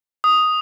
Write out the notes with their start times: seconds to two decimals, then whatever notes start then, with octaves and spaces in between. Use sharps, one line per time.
0.24 D#6